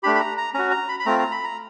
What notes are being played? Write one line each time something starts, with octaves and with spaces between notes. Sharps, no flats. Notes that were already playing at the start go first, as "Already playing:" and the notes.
A3 D4 G4 B5
B5
A#5
A#5
C#4 F#4 A#5
A#5
B5
B5
A3 C4 F4 A#5
A#5
B5
A#5